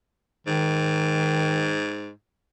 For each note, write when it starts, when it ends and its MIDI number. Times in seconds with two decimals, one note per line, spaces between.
0.47 2.10 44
0.47 1.83 51